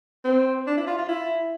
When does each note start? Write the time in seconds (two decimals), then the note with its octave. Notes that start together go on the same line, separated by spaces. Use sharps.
0.25 C4
0.67 D4
0.77 E4
0.87 F4
0.98 F4
1.09 E4